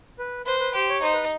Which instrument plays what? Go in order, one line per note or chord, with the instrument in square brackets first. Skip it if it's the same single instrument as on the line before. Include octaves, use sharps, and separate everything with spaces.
[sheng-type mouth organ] B4
[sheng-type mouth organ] B4 [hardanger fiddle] C5
[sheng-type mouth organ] B4
[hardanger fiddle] G4 [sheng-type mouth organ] C5
[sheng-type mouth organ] C#5
[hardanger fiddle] D#4 [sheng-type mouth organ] C5
[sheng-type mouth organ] B4